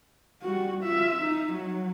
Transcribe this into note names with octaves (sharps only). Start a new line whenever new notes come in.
G3 F#4
F4 E5
D#4
F#3